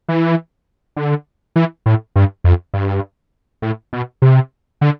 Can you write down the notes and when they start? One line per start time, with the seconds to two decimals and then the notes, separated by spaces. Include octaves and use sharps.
0.09 E3
0.97 D3
1.56 E3
1.86 A2
2.16 G2
2.44 F2
2.74 G2
3.62 A2
3.93 B2
4.22 C3
4.81 D3